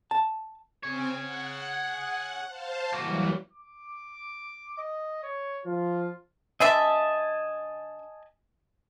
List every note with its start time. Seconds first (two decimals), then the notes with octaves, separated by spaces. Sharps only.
0.11 A5
0.83 C4 G#4 C#5 G#5
1.20 F#5
2.48 C5 F5 A5
2.93 E3 F#3 G3 A#3 F#4
3.52 D6
4.78 D#5
5.23 C#5
5.65 F3 F4
6.60 D3 D4 D#5 E5 G#5 A5